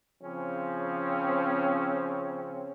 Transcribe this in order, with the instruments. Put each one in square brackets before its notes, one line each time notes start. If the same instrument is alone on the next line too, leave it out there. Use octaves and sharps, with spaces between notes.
[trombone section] C#3 F3 C4 C#4